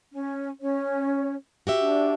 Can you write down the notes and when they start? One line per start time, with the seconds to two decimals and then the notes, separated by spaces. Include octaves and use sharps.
0.12 C#4
0.61 C#4 C#5
1.67 F#4 G4 E5
1.83 D4